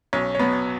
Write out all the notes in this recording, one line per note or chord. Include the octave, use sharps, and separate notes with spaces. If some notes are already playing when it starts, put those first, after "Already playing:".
B1 C#4 C#5
C#5
B2 F#3 B3 B4